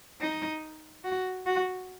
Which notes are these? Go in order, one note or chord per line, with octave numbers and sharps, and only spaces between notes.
D#4
F#4
F#4